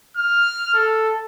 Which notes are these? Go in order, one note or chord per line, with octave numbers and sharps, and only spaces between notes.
F6
A4